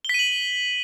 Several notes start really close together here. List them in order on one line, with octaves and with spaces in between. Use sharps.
G7 B6 D#7 F#7